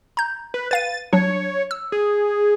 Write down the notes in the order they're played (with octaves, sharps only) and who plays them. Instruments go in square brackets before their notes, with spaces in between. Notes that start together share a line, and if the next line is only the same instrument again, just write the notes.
[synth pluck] A#5 G6
[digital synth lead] B4
[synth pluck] B4 F5 D#7 [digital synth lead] A6
[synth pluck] F#3 D4 [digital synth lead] C#5
[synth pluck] E6
[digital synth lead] G#4